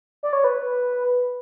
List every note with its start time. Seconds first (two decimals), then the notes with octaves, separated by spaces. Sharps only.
0.23 D5
0.33 C#5
0.44 B4